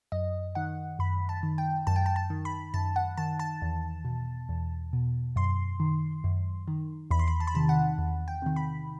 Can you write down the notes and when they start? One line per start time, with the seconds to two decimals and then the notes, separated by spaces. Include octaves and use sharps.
0.12 F#2 D#5
0.55 D#3 F#5
0.99 F#2 B5
1.29 A5
1.43 D#3
1.58 G5
1.87 F#2 A5
1.96 G5
2.06 A5
2.16 A5
2.30 D#3
2.45 B5
2.74 F#2 A5
2.96 F#5
3.17 D#3 A5
3.40 A5
3.62 E2
4.05 B2
4.49 E2
4.93 B2
5.36 F#2 C6
5.80 D#3
6.24 F#2
6.68 D#3
7.11 E2 B5
7.19 C6
7.28 B5
7.40 A5
7.47 B5
7.55 C3 D#3 A5
7.69 F#5
7.98 E2
8.28 G5
8.42 C3 D#3
8.56 B5